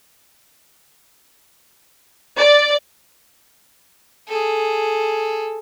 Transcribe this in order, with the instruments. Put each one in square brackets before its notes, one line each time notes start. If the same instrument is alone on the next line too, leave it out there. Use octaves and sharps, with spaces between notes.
[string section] D5
[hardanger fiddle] G#4 A4